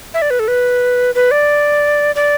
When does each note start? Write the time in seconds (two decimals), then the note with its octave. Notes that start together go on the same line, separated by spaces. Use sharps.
0.14 E5
0.22 D5
0.30 B4
0.39 A4
0.48 B4
1.15 B4
1.31 D5
2.16 D5